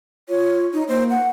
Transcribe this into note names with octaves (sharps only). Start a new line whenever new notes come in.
F4 C#5
D#4
A#3 C5
F#5